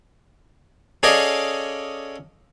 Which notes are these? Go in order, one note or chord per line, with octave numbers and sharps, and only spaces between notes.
C#4 G#4 A4 D5 D#5 F5